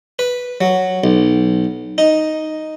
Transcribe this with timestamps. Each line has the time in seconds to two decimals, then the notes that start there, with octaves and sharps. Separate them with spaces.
0.19 B4
0.61 F#3
1.04 B1
1.98 D#4